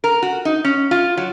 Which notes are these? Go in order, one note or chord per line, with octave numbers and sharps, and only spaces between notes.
A#4
F#4
D#4
C#4
F4
F#3